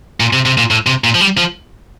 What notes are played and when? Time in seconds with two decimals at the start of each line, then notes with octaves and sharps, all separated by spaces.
0.20 A#2
0.33 C3
0.45 C3
0.58 A#2
0.71 A2
0.87 C3
1.04 A#2
1.15 F3
1.21 G3
1.38 F3